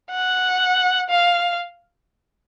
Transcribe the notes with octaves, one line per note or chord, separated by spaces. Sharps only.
F#5
F5